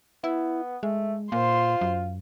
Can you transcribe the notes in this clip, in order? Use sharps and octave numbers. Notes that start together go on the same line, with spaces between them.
B3 E4
G#3 A3
A#2 F4 C5 C6
F#2